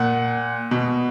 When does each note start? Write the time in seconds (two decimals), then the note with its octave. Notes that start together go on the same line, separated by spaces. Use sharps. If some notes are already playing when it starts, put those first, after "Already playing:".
Already playing: A#2 F#5
0.71 B2